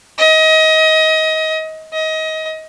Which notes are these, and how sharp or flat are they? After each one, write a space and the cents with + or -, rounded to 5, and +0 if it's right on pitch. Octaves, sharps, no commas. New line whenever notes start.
D#5 +25
D#5 +25